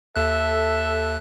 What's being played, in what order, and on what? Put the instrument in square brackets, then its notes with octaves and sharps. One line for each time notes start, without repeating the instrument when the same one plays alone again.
[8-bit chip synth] D#2 F#6 [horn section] A4 E5